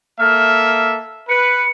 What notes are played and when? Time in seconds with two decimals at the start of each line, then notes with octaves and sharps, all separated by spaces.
0.19 A#3 A4 E5 F6
1.29 B4 C#7